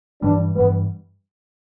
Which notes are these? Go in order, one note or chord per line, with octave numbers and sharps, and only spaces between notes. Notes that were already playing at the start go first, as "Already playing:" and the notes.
G2 E3 G3 D4
G2 E3 G3 B3